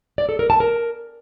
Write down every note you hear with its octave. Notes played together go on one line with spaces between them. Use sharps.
D5
A4
A#4
A5
A#4